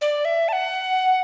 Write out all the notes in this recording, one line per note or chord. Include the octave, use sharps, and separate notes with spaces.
D5
E5
A5
F#5